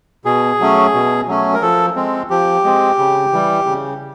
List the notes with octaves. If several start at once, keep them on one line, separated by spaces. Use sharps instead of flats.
B2 G#4
F#3 A3 C#4
B2
F#3 A3 C#4
A#4
F3 A4
G#3 C4
F3 G4
G#3 C4
C#3
E3 G3
C#3